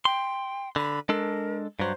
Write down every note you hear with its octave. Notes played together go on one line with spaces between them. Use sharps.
G5 C6
D3 B5
G#3 D4 A4 A#4
G2 F#3 C5